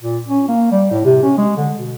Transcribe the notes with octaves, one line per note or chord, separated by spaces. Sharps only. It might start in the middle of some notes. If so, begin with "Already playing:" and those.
A#2
C#4
A#3
G3
A2
C3
C#4
G#3
D3
B2